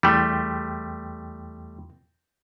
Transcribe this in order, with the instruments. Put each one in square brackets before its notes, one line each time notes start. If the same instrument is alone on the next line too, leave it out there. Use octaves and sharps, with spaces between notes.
[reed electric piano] E2 G5 C6 [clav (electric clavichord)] G3 A3